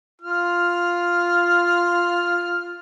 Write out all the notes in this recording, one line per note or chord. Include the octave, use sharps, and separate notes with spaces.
F4 F6